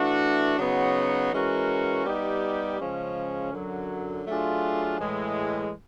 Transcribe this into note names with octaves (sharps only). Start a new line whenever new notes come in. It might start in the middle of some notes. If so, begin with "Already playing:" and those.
Already playing: E3 A3 D4 F#4
C#3 F#3 B3 D#4 F#4
E3 G#3 C#4 F#4 A#4
G3 B3 D#4 G4
C#3 F3 G#3 C#4
F#2 D3 F#3
F#3 A3 D4 F4 G#4
A2 E3 G#3